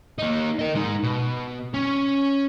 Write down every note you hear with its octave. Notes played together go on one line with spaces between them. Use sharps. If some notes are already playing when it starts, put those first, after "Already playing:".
A#3 D#4
A#4 D#5
G#3 D#4
B2
C#4